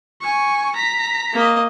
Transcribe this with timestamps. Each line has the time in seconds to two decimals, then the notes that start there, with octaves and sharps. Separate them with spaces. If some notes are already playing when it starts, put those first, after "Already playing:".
0.21 G#5 C#6
0.76 A#5 B6
1.33 A#3 D#5